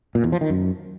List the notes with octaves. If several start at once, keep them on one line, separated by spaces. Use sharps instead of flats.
A#2
E2
F3
D#3
F#2